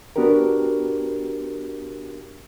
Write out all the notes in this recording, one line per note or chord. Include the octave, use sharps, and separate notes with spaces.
B3 D4 F#4 G4 A#4